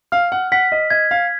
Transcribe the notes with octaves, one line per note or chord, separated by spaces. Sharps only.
F5 F6
F#5
F#5 B6
D#5
D#5 G#6
F5